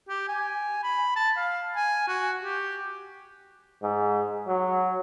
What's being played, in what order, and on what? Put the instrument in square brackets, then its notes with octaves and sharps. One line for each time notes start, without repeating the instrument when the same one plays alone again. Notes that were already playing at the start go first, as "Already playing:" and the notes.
[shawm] G4
G#5
B5
A5
F5
G#5
F#4
G4
[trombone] G#2
F#3